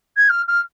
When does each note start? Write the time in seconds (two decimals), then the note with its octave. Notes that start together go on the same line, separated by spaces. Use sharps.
0.17 G#6
0.29 F6
0.48 F6